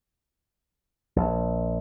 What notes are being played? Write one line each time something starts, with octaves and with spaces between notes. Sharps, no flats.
A#1